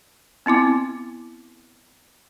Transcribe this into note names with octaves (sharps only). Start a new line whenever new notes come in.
B3 C4 E4 D6